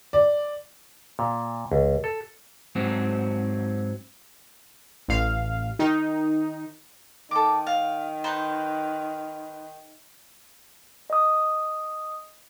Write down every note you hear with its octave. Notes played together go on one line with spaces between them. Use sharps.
D5
A#2
C#2
A4
G#2 F#3 C4
A1 F5
D#3 D#4
D#3 A4 D6
F5
D#4 B4 C5
D#5 D#6